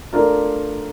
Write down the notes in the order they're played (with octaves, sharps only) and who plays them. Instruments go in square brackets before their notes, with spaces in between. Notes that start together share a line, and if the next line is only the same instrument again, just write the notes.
[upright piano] A3 D4 F4 A#4